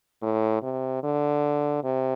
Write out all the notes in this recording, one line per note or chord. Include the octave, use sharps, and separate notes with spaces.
A2
C3
D3
C3